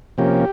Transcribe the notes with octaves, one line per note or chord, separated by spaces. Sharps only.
C3 F3 A#3 C#4 G4